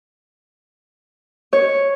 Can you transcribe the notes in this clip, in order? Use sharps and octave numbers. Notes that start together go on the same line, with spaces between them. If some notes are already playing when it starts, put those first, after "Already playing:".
C#5